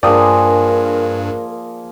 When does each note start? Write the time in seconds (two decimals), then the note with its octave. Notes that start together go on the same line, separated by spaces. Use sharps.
0.03 G2 F3 A#3 G#4 A#4 D5 G5 D#6